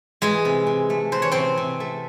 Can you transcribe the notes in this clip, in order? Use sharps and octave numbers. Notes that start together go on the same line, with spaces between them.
E3 G#3 G#4
C3
C3
A3
E3 C5
C#5
C3 C4 C5
C3
A3